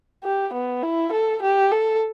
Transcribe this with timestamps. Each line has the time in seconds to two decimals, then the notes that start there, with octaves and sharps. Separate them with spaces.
0.24 G4
0.54 B3
0.83 E4
1.12 A4
1.42 G4
1.71 A4